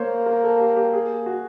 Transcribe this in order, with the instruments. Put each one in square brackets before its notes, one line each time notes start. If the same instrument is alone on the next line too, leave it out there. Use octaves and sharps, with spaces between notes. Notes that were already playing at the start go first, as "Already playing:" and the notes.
Already playing: [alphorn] A#3 [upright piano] C5 C#5
[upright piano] A#4
A4
G4
G4
G#4
F#4